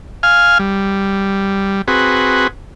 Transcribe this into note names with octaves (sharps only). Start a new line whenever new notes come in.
F5 G#5 F6
G3
C4 F#4 G#4 B4